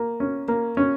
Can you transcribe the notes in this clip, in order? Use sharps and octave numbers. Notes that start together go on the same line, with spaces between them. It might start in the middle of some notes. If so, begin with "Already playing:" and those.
Already playing: A#3
C#4
A#3
C#4